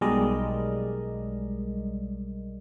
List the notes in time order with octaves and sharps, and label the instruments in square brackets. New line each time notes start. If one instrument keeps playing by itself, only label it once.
[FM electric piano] B1 G3 G#3 A#4 D5 D#5